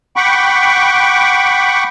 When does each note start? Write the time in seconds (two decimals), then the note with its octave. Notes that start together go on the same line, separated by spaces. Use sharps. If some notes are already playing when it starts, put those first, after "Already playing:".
0.16 F#5 G5 B5 C#6 D6